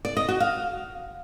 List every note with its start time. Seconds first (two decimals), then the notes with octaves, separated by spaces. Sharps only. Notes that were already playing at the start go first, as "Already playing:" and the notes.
0.05 D5
0.17 D#5
0.28 F#4
0.40 F5